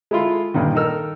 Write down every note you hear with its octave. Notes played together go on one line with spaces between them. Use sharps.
G#3 E4 F4 A4
G2 A#2 D3 D#3
D#3 D#4 A4 A#4 E6 F6